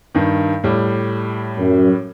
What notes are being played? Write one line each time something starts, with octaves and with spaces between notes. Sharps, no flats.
G2 D#3
A2 G3
F#2